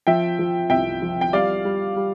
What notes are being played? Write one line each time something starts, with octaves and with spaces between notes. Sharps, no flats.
F3 E5 G5
F3
C2 E5 G5
F3
G5
G3 D5 F5
G3
G3